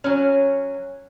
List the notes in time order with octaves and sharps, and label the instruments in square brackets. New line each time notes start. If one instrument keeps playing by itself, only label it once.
[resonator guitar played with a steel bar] F#3 C#4